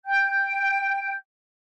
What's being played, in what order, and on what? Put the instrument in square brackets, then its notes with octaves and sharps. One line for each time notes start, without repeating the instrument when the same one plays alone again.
[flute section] G5 G6